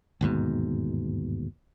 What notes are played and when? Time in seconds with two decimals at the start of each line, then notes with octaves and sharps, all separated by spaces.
0.21 G1 D#2 G#2 B2